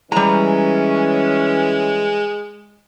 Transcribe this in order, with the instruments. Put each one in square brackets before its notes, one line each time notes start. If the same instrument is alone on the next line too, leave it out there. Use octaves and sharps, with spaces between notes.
[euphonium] E3 [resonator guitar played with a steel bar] G3 A#5 [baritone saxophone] G#3 [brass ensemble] C#4